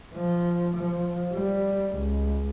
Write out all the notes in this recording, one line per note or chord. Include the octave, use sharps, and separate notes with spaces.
F3
F3
G3
C#2